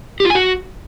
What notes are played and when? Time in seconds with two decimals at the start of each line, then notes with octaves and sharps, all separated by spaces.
0.20 G4
0.25 F4
0.30 G#5
0.35 F#4